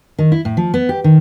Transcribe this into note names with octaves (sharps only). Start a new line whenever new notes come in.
D#3
E4
A2
F3
B3
G4
D#3